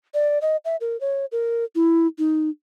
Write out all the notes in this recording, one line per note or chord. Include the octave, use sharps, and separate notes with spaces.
D5
D#5
E5
A#4
C#5
A#4
E4
D#4